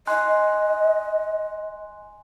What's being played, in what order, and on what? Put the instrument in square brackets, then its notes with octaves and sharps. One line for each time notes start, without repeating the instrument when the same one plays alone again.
[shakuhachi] D#5 [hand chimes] G#5 C6 F#6